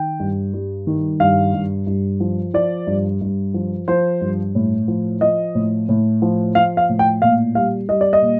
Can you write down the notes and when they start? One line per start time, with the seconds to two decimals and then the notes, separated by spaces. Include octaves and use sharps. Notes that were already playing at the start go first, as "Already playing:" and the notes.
Already playing: D#3 G5
0.20 G2
0.54 G3
0.87 D#3
1.20 G2 F5
1.54 G2
1.87 G2
2.20 F3
2.54 F3 D5
2.87 G2
3.21 G2
3.54 F3
3.88 F3 C5
4.21 G2
4.55 A2
4.88 F3
5.21 F3 D#5
5.55 A2
5.89 A2
6.22 F3
6.55 F3 F5
6.77 F5
6.89 A2
6.99 G5
7.22 A#2 F5
7.55 G3 F5
7.89 G3 D#5
8.01 D5
8.13 D#5
8.22 A#2